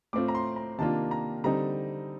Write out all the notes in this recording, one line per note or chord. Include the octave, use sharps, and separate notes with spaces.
A2 A3 C4 F4 D6
A#5
C6
A#5
C3 D#3 A#3 D4 F4 A5
A#5
D3 G3 C4 D#4 A#5